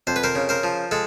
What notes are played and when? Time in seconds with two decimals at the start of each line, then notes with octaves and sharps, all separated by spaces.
0.07 F2 C5
0.16 B4
0.24 A#4 C5
0.35 C#3
0.49 A#4 C5
0.63 F3
0.91 G#3 A4